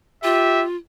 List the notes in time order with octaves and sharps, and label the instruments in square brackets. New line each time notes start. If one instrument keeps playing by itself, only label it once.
[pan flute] F4 [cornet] G4 [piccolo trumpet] E5